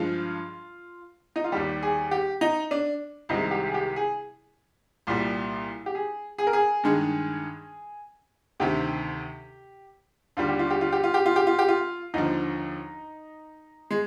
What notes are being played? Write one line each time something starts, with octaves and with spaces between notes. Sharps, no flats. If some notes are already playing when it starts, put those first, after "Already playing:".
Already playing: G2 F3 G#3 F4
D#4
F4
D#2 D#3 G3 G4
G#4
G4
D#4
D4
C2 C3 D#3 G#3 D#4
G4
G#4
G4
G#4
C2 A#2 G3
G4
G#4
G#4
A#4
G#4
G2 D#3 G#3
D2 C3 D#3 G4
D#2 D3 G3 F4
G4
F4
G4
F4
G4
F4
G4
F4
G4
F4
G4
F4
D#2 D3 F3 D#4
G#3